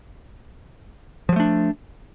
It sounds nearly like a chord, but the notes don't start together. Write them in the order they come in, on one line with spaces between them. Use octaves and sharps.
F3 F#3 A3 D4